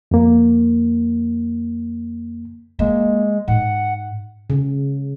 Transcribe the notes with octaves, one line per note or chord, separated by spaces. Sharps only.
F2 A#3
G#3 A#3
G#2 F#5
C#3